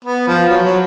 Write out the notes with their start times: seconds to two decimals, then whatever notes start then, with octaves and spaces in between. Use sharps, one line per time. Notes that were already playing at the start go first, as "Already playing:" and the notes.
0.05 B3
0.27 F3
0.49 F#3
0.65 F#3